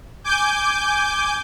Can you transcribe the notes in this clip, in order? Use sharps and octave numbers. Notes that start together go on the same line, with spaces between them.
G#5 D6 G6